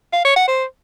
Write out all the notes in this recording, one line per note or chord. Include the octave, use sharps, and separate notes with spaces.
F5
C#5
F#5
C5